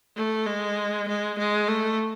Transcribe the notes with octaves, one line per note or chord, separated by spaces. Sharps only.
A3
G#3
G#3
G#3
A3